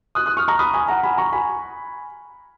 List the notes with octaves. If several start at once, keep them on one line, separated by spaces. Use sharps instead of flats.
D#6 F#6
D#6 F#6
C#6 F6
A#5 C#6
B5 D#6
G#5 B5
F#5 A#5
G#5 B5
A#5 C#6
G#5 B5